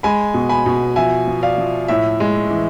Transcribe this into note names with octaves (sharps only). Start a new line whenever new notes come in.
G#3 G#5 B5
B2
G#5 B5
B2
F3 E5 G#5
F3
D5 F5
F3
A2 E5
G#3
E3